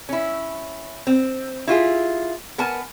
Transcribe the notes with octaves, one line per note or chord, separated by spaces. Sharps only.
C#4 E4
C4
E4 F4 G4 G#4
B3 A#4 G#5 A5